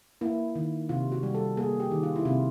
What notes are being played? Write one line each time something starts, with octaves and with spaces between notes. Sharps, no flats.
A#3 E4
D#3
C3 F4
F#4
G3
A4
A#3 G#4
G4
D#3
F4
E4
C3 F4